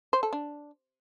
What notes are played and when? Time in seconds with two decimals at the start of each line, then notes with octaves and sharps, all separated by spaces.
0.13 C5
0.23 A4
0.33 D4